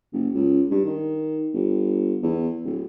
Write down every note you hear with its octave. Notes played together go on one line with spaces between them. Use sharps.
F#1
C#2
G2
D#3
G1
E2
D1